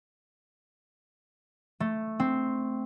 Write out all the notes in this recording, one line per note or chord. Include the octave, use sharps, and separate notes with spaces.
A3
C4